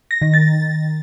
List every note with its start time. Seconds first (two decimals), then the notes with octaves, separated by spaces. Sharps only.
0.11 A#6
0.22 D#3
0.34 A6